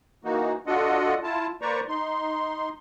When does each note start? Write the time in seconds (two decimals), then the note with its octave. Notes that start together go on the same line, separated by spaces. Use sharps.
0.24 E3 A#3 D#4 F#4
0.67 D4 F4 F#4 A4 D#5 F#5
1.23 E4 F4 A5
1.62 A#3 B4 C5 D5 A#5 C#6
1.88 D#4 C6